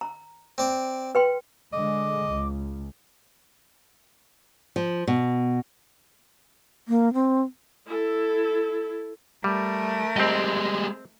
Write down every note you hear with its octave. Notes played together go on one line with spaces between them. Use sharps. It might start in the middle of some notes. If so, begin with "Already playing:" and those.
A#5
C4 D5 D6
B4 G5 C6
D3 G#3 D#5 D6
C#2
F3
B2
A#3
C4
E4 A4
G3 A3 A#4
G3 G#3 C4 D#5